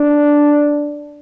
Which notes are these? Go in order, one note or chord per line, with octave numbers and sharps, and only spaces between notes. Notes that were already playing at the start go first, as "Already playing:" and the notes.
Already playing: D4